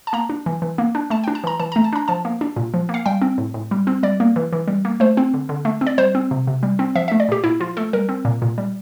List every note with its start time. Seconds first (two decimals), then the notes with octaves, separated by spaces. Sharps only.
0.07 A5
0.13 A#3 A#5
0.30 D4
0.46 E3
0.62 E3
0.78 A#3
0.95 D4
1.10 A3 A5
1.24 G5
1.28 D4
1.35 A5
1.44 E3 A#5
1.60 E3 A5
1.72 A#5
1.76 A3
1.84 A5
1.93 D4 A#5
2.08 F3 A5
2.25 A#3
2.41 D4
2.56 A#2
2.74 F3
2.89 A#3
2.94 F5
3.06 G3 G5
3.22 C4
3.38 A2
3.54 A2
3.71 G3
3.87 C4
4.03 G3 D5
4.20 A#3
4.36 E3
4.53 E3
4.68 G3
4.85 A#3
5.00 A3 C5
5.17 C4
5.34 D3
5.49 D3
5.65 A3
5.81 C4
5.87 D5
5.98 G3 C5
6.15 C4
6.31 C3
6.47 C3
6.63 G3
6.79 C4
6.95 F3 E5
7.08 E5
7.12 A3
7.20 D5
7.29 A#2 G4
7.44 A#2 E4
7.60 F3 F4
7.77 A3 A4
7.93 G3 A#4
8.09 C4
8.25 A#2
8.42 A#2
8.58 G3